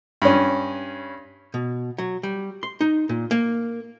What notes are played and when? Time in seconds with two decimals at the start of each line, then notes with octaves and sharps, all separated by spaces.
0.22 G2 C#4
1.54 B2
1.98 F#3
2.23 G3
2.63 C6
2.81 D#4
3.09 A#2
3.31 A#3